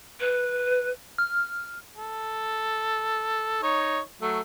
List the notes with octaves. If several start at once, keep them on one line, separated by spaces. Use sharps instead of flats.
B4
F6
A4
D#4 C#5
F#3 A3